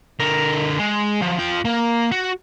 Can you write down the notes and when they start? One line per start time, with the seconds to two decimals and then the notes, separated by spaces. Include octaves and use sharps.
0.20 D3 A#4
0.79 G#3
1.21 F3 F#3
1.38 F4 G5
1.65 A#3
2.12 F#4